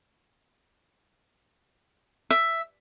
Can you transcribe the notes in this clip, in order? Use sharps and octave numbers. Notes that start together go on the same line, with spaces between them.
E5